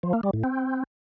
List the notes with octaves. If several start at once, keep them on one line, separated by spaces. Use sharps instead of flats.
F3
A#3
G3
A2
C4